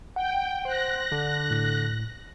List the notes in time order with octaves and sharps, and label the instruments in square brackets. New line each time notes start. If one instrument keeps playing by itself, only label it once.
[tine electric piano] F#5 [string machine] G5
[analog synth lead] C5 [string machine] F#6 A#6
[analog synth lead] D3
[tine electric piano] A2